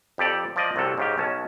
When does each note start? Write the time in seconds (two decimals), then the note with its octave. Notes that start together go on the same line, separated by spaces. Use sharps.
0.18 F2 G4 A4 D5
0.56 F3 D5 D#5
0.76 C2 C3 F#3 A4
0.98 G#2 C#3 G4
1.18 B1 C#4 A5